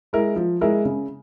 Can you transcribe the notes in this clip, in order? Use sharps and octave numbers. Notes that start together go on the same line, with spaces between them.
G#3 E4 A#4
F3
G#3 E4 A#4
C#3